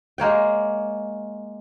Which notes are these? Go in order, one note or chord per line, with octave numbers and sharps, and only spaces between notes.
G#3 A#3 C#5 G5